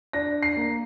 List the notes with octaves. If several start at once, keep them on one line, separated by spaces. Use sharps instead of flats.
D4 A#6
C7
A#3